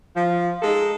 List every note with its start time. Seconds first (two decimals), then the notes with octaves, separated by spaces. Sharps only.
0.16 F3
0.62 G#3 D#4 A4